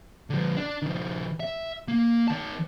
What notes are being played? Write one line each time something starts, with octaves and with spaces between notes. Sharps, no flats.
D3 F3
D4
D#3 F3
E5
A#3
D#3 A5